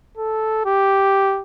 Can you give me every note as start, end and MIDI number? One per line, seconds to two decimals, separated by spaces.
0.17 0.63 69
0.66 1.42 67